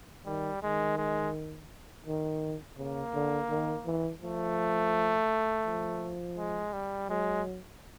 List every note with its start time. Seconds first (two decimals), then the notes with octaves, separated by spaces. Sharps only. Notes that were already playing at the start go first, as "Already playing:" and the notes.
0.26 D#3 G3
0.62 D#3 G#3
0.98 G#3
2.06 D#3
2.78 C#3 A#3
3.14 D3
3.49 D#3
3.86 E3
4.22 F3 A3
5.66 F3
6.38 G#3
6.73 G3
7.09 F#3 G#3